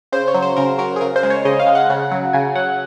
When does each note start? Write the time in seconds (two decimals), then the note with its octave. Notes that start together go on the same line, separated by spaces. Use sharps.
0.12 C#3 C5
0.28 C#5
0.34 F#3
0.42 C5
0.57 C#3 A#4
0.79 F#3 A#4
0.96 G#4
1.01 C#3 A#4
1.16 C5
1.23 G#3
1.30 C#5
1.45 C#3 D#5
1.60 F5
1.67 G#3
1.75 F#5
1.90 C#3
2.11 F#3
2.33 C#3 G#5
2.55 F#3 F#5